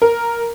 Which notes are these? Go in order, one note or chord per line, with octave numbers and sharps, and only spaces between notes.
A#4